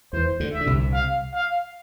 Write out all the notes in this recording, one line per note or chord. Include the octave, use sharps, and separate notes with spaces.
E2 E3 C5
D2 D3
E5
D3
C2 C3
F5
F5